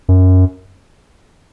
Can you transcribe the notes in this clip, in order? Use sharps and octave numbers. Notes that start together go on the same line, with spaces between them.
F#2